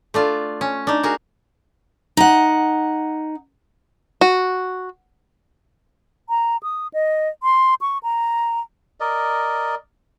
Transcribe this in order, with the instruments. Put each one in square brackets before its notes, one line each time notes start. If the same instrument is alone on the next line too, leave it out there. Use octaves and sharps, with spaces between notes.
[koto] A3 D4 F4
C#4
D4 D#4
F#4 G#4 A#4
[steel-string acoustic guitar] D#4 F#5
[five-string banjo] F#4
[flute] A#5
D#6
D#5
C6
C#6
A#5
[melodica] A#4 D5 D#5